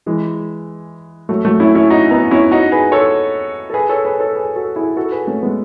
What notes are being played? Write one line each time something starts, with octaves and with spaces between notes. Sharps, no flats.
E3 G#3
F#3 A3
F#3 A3
C#4 E4
C#4 E4
D#4 F#4
B3 D#4
C#4 E4
D#4 F#4
G#4 B4
A4 C#5
A4
G#4 B4
A4 C#5
G#4 B4
A4 C#5
G#4 B4
F#4 A4
E4 G#4
F#4 A4
G#4 B4
A3 C#4
G#3 B3